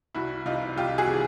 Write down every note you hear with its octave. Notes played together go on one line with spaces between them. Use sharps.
C2 E4 F#4
C3 E3 D#4 F4
C2 F4 G4
F#4 G#4
C3 E3